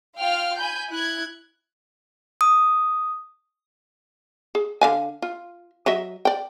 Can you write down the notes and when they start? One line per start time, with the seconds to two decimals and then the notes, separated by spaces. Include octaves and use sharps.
0.18 F4 F5 G5 F6
0.58 G#5 B5 G6
0.91 E4 F#6 G#6
2.41 D#6
4.55 G#4
4.81 D3 F5 G#5
5.22 F4
5.86 F#3 D#5 E5
6.25 D5 G5